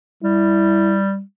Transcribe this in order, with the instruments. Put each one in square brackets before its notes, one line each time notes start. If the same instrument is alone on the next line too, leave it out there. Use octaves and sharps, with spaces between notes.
[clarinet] G3 [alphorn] E4